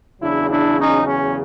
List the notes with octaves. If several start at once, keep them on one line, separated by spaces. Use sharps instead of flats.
E2 C#3 F#3 D4 E4
D4 E4
C#4 D#4
C#4